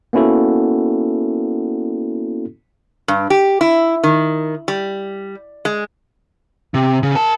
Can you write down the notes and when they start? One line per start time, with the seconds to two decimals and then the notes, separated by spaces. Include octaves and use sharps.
0.13 A#3 B3 C#4 E4 F#4 A4
3.08 G2
3.30 G4
3.61 E4
4.03 D#3
4.68 G3
5.65 G#3
6.74 C3
7.03 C#3
7.15 A#4 A5